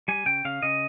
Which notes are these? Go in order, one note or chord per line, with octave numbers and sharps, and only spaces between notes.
G3 G#5
C#3 G5
C#3 F5
C#3 D#5